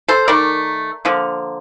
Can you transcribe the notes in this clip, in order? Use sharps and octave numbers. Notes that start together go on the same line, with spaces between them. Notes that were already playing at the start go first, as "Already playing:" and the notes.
A4 C5
D#3 A3 A#4 D5
D3 F3 A#3